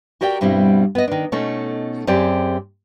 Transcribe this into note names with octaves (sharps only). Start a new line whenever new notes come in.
F#4 G4 A#4 D5 D#5 G5
G2 B2 G3 C4 E4 F#4
B3 D#5
D#3 D4
B2 A3 C#4 D#4 A4
F#2 C4 G4 G#4 D5